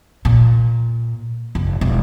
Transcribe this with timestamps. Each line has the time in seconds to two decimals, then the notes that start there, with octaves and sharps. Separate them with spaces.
0.25 A#2
1.55 F#1
1.81 E1